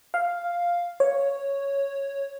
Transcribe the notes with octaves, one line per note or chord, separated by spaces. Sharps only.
F5
C#5